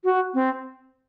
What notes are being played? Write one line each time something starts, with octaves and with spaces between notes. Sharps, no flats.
F#4
C4